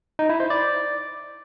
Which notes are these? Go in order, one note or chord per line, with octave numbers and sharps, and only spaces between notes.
D#4
E4
C5
D5